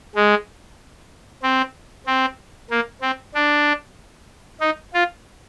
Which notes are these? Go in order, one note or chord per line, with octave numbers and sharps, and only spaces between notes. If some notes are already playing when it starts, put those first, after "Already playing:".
G#3
C4
C4
A#3
C4
D4
D#4
F4